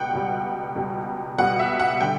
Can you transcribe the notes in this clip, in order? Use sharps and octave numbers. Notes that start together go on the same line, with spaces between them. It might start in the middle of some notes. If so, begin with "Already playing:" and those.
Already playing: C#2 B2 G3 F#5 G5
C#2 B2 G3
C#2 B2 G3
C#2 B2 G3 F#5
E5
F#5
D3 G3 G5